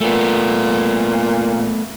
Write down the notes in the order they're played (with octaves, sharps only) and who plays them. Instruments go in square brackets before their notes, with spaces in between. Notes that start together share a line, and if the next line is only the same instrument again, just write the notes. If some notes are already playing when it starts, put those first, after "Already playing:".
[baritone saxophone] A#2 [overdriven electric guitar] A3 B3